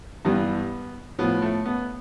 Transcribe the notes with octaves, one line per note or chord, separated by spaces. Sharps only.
G2 E3 G3 B3
A2 F3 B3
A3
B3